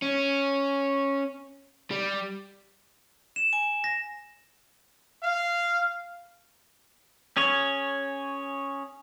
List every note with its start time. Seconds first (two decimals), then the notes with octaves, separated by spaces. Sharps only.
0.02 C#4
1.91 G3
3.36 E7
3.53 G#5
3.84 A#6
5.23 F5
7.37 C#4 G#4 C#5